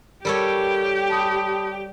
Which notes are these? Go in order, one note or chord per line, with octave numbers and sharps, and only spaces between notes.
G3 G4 A4 A#4 C#5 G5 B5
A5 B5 D#6